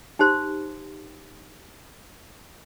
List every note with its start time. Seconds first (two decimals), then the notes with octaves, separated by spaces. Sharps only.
0.19 D#4 G4 C5 C6